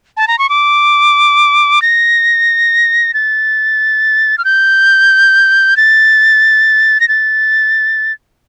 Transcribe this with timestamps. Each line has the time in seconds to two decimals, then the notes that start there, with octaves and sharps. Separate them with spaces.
0.17 A5
0.28 A#5
0.39 C#6
0.49 D6
1.82 A#6
3.14 A6
4.38 F6
4.45 G6
5.77 A6
7.00 A#6
7.09 A6